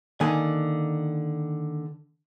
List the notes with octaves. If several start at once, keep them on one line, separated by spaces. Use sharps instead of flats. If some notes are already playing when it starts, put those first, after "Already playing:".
D3 D#3 A#3 G#5